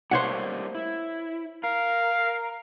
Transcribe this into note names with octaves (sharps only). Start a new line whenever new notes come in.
G3 A3 A#3 C5 C#5 F#5
E4
A#4 F5